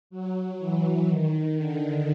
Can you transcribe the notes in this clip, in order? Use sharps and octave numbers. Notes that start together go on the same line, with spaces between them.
F#3
E3
D#3
D3